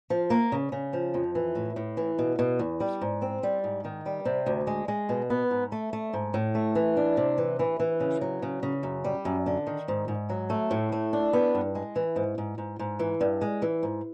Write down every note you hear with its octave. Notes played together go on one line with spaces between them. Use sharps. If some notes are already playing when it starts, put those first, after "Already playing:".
F3
A#3
C#3
C#3
F3
F2
E3
A2
A2
E3
B2
B2
E2
G3
G#2
C4
G3
G#2
D#3
G3
C3
D2
G#3
G#3
B2
B3
G#2
A3
A3
G#2
A2
A3
E3
D4
C3
E3
E3
E3
C#3
F#3
C#3
C#3
F#2
G3
F#2
D3
D#3
G#2
G#2
F#3
A3
A2
A3
D4
B3
G2
G#3
E3
G#2
G#2
G#2
G#2
E3
G2
G#3
E3
G#2